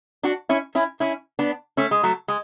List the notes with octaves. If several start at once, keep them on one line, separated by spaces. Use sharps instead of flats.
D4 F#4
C#4 E4
C#4 E4
C#4 E4
B3 D4
A3 C#4
G#3
F#3 A3
G#3